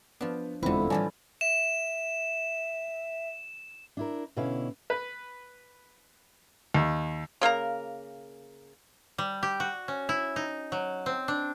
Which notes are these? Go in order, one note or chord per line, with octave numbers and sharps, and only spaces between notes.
F3 B3 D4
F1 E2 D3 G#3 C4 E4 F4 B4
A2 E3 F3 G3 D5 G#5 A5
E5 E7
D4 E4 A#4
B2 D3 C#4 E4 C#5 F5
B4
D#2
C#3 A#3 A#4 A#5
G3
G4
F#4
C#4
E4
D#4
F#3
C4
D4